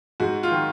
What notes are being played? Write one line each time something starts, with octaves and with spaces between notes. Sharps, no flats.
G#2 F#4
F4
D#3